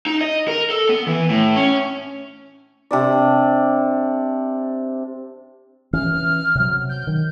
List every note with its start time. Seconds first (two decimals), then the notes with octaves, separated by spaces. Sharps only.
0.06 D#4
0.21 D#5
0.48 A#4
0.70 A4
0.89 B3
1.07 E3
1.29 A2
1.56 C#4
2.91 C3 D4 D5
5.93 E3 C#4 F6
6.55 C3 F#3
6.89 G6
7.07 D#3